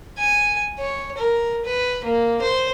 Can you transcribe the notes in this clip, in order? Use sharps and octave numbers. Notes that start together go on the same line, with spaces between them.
G#5
C#5
A#4
B4
A#3
C5